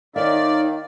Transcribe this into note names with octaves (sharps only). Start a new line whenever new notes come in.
D#3 A#3 D#4 C#5 D5 E5